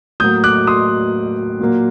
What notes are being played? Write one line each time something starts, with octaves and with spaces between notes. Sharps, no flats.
A2 F#3 A#3 D#6 G6
D6 F#6
C6 D#6
A#2 F#3 A#3